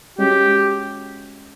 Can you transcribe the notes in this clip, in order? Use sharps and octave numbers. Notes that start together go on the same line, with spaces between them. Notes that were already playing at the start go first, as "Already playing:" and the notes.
G#3 C#4 F#4 G4